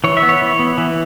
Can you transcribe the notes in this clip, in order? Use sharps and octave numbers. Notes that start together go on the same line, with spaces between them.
E3 C#5
E5
B3
C#5
E3
B3
E3